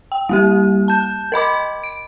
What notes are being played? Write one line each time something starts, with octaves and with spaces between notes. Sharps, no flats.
G5
G3 A#3 G4
A5 G6
A#4 D#5 B5 D6
D7